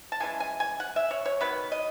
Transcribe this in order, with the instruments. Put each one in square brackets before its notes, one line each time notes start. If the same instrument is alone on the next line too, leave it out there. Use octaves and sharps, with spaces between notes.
[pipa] A5
C#3 E3 G#3 G#5
G#5
G#5
F#5
E5
C#5
C#5
D#3 F#3 B3 B4
D#5